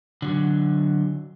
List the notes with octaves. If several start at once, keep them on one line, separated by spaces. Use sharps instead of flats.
D3 F#3